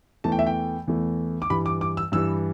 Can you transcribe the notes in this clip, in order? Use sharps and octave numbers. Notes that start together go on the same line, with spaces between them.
E2 E3 A3 A5
G5
E5
G5
E2 E3 A3
D6
G2 E3 G3 B5
D6
D6
E6
G2 E3 G3 E6